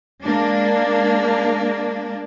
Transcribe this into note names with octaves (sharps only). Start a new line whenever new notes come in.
G#3 A#3 D4